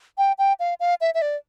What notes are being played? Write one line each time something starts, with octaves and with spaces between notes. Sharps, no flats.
G5
G5
F5
F5
E5
E5
D5